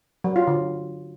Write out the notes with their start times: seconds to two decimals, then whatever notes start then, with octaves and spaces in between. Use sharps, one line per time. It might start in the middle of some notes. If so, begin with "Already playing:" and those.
0.24 F#3
0.36 F4
0.47 D3